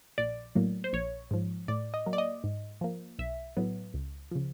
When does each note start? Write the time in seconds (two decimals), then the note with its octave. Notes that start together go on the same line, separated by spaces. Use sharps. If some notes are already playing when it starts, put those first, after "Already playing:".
0.18 A#1 D5
0.55 A2 F#3 A#3
0.84 C5
0.93 A#1 C#5
1.31 G#2 F3
1.68 A2 D5
1.94 D#5
2.06 F#3 A#3
2.13 D5
2.18 D#5
2.44 G#2
2.81 F3 A#3
3.19 B1 E5
3.57 A2 F#3 B3
3.94 C#2
4.31 C#3 F3